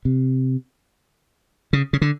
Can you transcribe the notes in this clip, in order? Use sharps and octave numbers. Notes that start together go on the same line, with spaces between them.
C3
C#3
C#3
D3